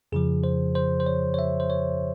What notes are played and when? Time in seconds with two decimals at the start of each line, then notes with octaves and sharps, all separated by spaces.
0.12 F2 C#3 F3 G#4
0.44 C5
0.75 C5
1.00 C5
1.06 C#5
1.34 C#5
1.39 E5
1.60 C5
1.70 C#5